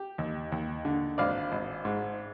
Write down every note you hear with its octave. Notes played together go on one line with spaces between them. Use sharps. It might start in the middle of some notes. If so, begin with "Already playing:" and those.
Already playing: G4
D#2
D#2
D3
G#1 D5 F5
G#1
G#2